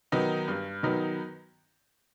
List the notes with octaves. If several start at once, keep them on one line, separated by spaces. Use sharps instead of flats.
D#3 F#3 B3 D#4
G2
D#3 F#3 B3 D#4